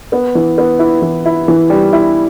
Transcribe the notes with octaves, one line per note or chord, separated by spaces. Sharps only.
B3
E3
B3
E4
E3
E4
E3
G3
E4